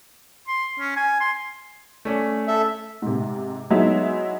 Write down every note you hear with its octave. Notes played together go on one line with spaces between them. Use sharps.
C6
C#4
G#5
C6
A3 C#4 D5
A4 E5
G#2 C3
F#3 G#3 B3 D#4 E4 E5